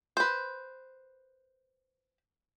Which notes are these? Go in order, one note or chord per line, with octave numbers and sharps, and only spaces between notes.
B4 C5